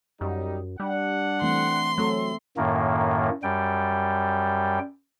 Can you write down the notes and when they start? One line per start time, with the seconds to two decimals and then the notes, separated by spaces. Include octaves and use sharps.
0.21 F#2 G3 D#4
0.80 G3 D4 F#5
1.42 E3 A3 C4 C6
1.98 F#3 A3 C4 A4
2.57 F#2 A2 D#3 A#3
3.43 F#2 G3 G5